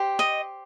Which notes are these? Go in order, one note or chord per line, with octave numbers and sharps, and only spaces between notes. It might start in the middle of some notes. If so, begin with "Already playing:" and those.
Already playing: G4 C5
D#5